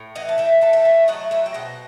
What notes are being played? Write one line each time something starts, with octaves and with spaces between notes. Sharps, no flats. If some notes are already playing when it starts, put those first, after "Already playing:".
Already playing: A2
E3 D#5 F#5
A5
E3 E5 G5
E3 A5
E5 G5
A3
F#3 D#5 F#5
F#3 C5 E5
G5
B2 D#5 F#5